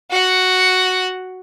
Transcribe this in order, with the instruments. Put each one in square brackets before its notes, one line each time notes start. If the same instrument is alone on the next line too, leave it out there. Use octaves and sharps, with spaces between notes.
[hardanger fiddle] F#4 F#5